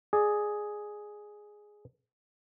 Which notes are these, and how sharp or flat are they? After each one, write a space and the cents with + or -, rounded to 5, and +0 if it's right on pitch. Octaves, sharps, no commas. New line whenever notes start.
G#4 +5 D5 +25